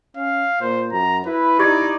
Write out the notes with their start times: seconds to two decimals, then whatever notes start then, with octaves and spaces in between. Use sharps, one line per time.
0.17 C#4 F5
0.61 A#2 C5
0.92 F#2 A#5
1.26 E4 B4
1.59 D#4 G4 D5 C#6 G#6